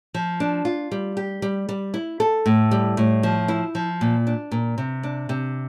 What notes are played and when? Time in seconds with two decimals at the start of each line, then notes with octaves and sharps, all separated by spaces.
0.14 F3
0.40 D4
0.65 F4
0.92 G3
1.17 G4
1.42 G3
1.69 G3
1.94 E4
2.20 A4
2.46 A2
2.71 G3
2.97 A2
3.23 F3
3.48 E4
3.75 F3
4.01 A#2
4.27 D4
4.51 A#2
4.78 C3
5.03 D4
5.29 C3